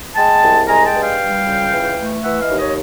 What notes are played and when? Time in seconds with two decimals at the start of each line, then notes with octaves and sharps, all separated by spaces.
0.16 G#3 G5 A5
0.42 C2
0.68 G#3 G#5 A#5
0.86 G5 A5
0.95 G2
1.03 F5 G5
1.21 G3
1.46 C#2
1.72 E3
1.98 A3
2.24 E3 E5 F#5
2.41 D#5 F5
2.50 D#2
2.59 C#5 D#5